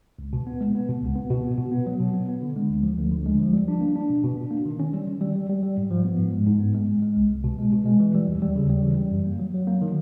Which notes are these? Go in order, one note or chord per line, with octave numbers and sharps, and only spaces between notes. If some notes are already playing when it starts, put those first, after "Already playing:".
C#2
B2
B3
G#3
B3
B2
C#2
B3
B2
B3
B2
B3
F#3
B2
B3
B3
D3
G#3
D2
F3
D2
D3
G#3
F3
G3
D4
A#3
D4
B2
B2
D4
A#3
D#3
C#4
G3
D#3
G3
G3
G3
G3
G#2
F3
B3
G#2
G#3
G#2
B3
G#3
G#3
G#3
C2
C2
B2
G#3
B2
G#3
E3
G3
D#2
G3
C#3
G3
E3
G3
F#2
A#3
F#3
F#3
A#3
D#3